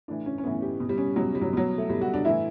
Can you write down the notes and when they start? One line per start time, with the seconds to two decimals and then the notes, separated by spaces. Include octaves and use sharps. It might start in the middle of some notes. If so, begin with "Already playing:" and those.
0.08 A2 E3 D4
0.26 C#4
0.38 C#4
0.44 A2 E3 B3
0.62 G4
0.80 B2
0.89 G3
0.98 C#4
1.16 B2 F#3
1.35 G3
1.41 F#3
1.53 B2 F#3
1.78 A3
1.90 B2 G3
2.01 F#4
2.14 D4
2.25 A2 E3 E4